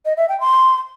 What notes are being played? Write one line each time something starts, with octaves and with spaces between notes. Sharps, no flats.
D#5
E5
G5
C6